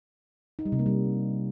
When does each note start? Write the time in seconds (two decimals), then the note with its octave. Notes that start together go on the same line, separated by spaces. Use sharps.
0.59 D#4
0.65 G3
0.72 C3
0.79 A#3
0.86 G3